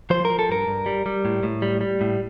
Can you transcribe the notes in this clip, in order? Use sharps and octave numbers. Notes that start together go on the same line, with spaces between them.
F3 C5
A#4
F3
A4
G2 A#4
G2
G3
G3
A2
A2
G3
G3
A2